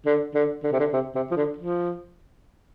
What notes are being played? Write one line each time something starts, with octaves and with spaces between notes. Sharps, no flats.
D3
D3
D3
C3
D3
C3
C3
F3
D3
F3